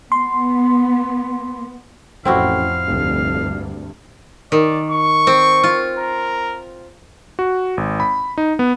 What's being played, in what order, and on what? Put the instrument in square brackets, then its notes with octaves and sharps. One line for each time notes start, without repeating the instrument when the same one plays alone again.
[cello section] B3 [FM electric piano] C6
[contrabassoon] A1 [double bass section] F2 A2 [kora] C4 E4 F#4 [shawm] F5
[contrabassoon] F1 [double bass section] D2 G2
[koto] D#3 [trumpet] D5
[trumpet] C#6
[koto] C4
F4
[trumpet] A#4
[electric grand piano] F#4
G#1
B5
D#4
B3